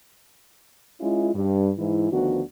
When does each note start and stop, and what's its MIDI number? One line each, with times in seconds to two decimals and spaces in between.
1.01 1.31 56
1.01 1.31 61
1.01 1.31 64
1.01 1.31 65
1.35 1.71 43
1.79 2.10 44
1.79 2.10 52
1.79 2.10 64
2.11 2.41 38
2.11 2.41 51
2.11 2.41 53
2.11 2.41 59
2.11 2.41 62
2.11 2.41 66